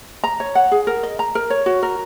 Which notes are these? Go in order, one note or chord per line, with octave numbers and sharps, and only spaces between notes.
A#5
C#5
F#5
G#4
A#4
D#5
A#5
A#4
C#5
F#4
A#4